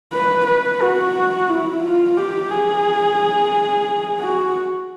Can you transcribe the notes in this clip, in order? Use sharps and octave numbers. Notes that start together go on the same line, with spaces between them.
B4
B4
F#4
E4
F4
G4
G#4
F#4